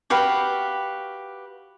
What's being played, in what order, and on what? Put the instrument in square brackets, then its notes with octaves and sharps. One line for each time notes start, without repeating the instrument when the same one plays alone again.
[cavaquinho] F#4 G4 B4 F5